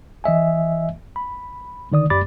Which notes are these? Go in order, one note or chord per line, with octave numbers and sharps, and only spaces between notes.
E3 D#5 E5 G#5
B5
D3 D#3 D5 D#6
F#2 G4 D5 B5 D6 A6